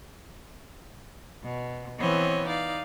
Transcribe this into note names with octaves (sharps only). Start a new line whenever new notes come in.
B2
E3 B3 C4 C#5 D#5
D#4 D5 F5